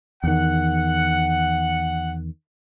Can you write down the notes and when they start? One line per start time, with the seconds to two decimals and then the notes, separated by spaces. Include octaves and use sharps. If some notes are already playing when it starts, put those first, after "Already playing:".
0.24 E2 D#3 F#5